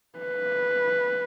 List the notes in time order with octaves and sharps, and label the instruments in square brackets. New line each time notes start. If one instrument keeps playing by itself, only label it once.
[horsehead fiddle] B4